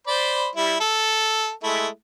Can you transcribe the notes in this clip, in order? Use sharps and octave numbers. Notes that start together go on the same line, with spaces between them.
C5 D5 B5
G3 E4
A4
G#3 A3 E4